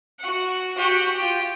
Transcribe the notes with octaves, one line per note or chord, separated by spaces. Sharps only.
F#4 F#5
F#4 G4
F4 G4